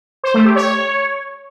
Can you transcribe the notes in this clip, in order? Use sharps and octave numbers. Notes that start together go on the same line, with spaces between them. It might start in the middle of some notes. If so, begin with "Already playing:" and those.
C5
A3
G4
C#5